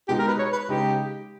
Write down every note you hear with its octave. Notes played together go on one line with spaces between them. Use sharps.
B2 G#3 D#4 G4
A#4
B4
C#5
B4
C#3 G#3 D#4 G4